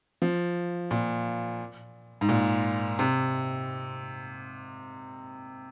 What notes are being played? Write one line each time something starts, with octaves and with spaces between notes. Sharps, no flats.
F3
A#2
G#2
A#2
C3